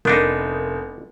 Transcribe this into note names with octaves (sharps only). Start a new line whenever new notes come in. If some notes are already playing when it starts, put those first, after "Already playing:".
F1 B3 D4 D#4 A#4 D#6 G6